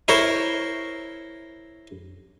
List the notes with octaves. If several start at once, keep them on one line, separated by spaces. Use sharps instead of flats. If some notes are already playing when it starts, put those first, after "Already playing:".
E4 A#4 C5 C#5 E5